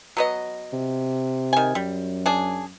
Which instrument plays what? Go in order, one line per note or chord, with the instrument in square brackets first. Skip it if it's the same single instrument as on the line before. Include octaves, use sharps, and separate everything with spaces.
[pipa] F#3 B3 D#5
[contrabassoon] C3
[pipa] D#3 G#5
[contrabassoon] F#2 [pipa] G3
[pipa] D4 G#4